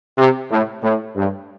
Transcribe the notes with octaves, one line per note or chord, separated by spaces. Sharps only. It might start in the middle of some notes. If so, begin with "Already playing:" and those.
C3
A2
A2
G2